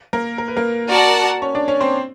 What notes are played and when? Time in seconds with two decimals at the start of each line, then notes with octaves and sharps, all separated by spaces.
0.13 A#3 A#4
0.38 A#4
0.48 B4
0.56 A#3 A#4
0.90 F#4 A#4 D5 F#5 A5
1.42 C#4 C#5
1.55 D4 D5
1.68 C#4 C#5
1.81 C4 C5